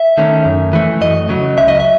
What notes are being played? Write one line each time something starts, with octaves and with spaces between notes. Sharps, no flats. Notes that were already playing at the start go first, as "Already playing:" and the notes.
Already playing: E5
D#3 A3 C#4
F#2
E3 A3
F#2 D#5
C#3 F#3
C#2 E5
D#5
E5